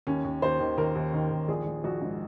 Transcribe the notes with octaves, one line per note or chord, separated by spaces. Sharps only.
D#2 C#4
D#2
D#2 C5
D#3
D#2 A#4
D#2
D#3
D#2
A#1 G#4
A#1
A#1 F#4
G#2